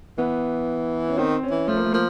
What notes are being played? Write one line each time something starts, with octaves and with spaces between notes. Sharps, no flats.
E3 B3
C#4
D#3 C4
C#4
E3
F3 A3
A#3
A3
F3 A#3